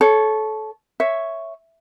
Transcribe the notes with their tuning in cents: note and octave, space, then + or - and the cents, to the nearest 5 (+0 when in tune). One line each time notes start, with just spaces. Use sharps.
A4 -20 C#5 +0
C#5 +0 E5 +0